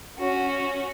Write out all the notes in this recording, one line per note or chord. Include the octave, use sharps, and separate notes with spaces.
C#4 F#4